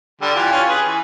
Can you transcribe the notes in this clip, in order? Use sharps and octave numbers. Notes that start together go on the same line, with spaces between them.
D3 G3
E3 F4 G4
C#4 F4
G#4 B4
E3